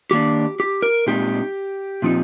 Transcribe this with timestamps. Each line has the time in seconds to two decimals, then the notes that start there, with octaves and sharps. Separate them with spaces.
0.11 D#3 A#3 D4 G4
0.60 G4
0.82 A#4
1.07 A#2 G#3 C4 D#4 G4
2.02 A#2 F3 C4 D#4